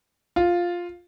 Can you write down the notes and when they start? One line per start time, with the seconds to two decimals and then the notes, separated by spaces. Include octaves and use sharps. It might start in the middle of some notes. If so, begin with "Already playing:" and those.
0.36 F4